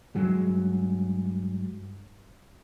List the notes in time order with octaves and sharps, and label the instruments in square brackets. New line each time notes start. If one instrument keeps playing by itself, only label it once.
[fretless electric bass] G2 F#3 G#3